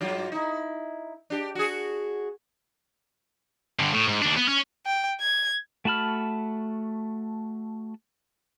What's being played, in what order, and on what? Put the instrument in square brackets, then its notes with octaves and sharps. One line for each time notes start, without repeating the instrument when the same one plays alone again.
[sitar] G2 F#3 F4
D#4 E4
D4 G4
F#4 G#4
[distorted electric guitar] G2 D3
A2
G#2
D#2 D4
B3
C#4
[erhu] G5
G#6
[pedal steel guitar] A3 F#4 A5 B5 F6